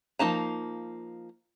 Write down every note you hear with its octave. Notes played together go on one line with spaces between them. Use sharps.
F3 A#3 D#4 A5 A#5